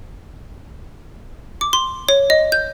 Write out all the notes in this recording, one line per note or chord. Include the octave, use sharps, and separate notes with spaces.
D6
C6
C#5
D#5
G6